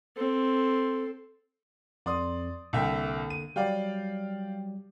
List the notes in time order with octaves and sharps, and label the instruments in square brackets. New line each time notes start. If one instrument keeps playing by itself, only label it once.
[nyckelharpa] C4 A4
[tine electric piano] F2 [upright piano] D5 C6 D#6
[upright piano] C2 E5 G5 [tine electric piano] D3 A#3 A4
[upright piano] D#7
[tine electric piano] F#3 G3 [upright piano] D5 F5 G5